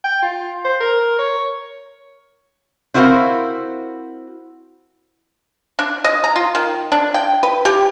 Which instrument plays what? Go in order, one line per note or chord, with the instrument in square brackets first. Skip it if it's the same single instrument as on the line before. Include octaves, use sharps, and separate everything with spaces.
[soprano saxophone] G5
F4
C5
A#4
C#5
[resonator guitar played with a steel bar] C4 E4 F#4 A#4 C5 F5
[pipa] D4
D#5
A#5
F4
D#3
D4
G5
B4
G4